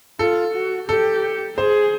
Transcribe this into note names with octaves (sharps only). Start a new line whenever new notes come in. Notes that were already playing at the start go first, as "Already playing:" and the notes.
F4 A4
F#4
G4 A4
G#4 C5